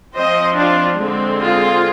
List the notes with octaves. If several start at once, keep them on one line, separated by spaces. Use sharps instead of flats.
F3 C4 C5 D#5
D4 F4
D3 G#3 C4
F4 G#4